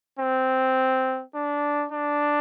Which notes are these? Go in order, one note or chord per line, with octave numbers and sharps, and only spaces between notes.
C4
D4
D4